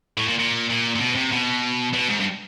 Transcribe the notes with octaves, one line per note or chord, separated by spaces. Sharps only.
A2
A#2
A#2
A#2
A#2
B2
C3
B2
B2
G#2
G2